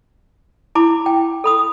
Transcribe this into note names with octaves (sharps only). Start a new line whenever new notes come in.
E4 A5 B5 D6
G5
A4 B5 D#6